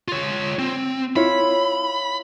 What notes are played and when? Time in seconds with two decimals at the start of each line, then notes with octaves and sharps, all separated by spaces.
0.08 F4 C#5
0.59 C4
1.16 E4 F4 C#5 B5